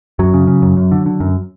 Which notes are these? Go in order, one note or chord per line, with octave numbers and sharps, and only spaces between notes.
F#2 F#3
C#3
C#3
F#2
F#2
D3
D3
F#2